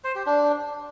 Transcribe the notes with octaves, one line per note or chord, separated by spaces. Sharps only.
C5
G4
D4